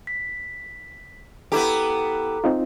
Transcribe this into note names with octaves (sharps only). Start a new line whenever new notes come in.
B6
B3 E4 G4 A4 A#5 D6
C4 D#4 F4